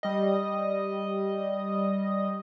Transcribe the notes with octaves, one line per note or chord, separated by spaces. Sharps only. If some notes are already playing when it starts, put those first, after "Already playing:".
G3 D#5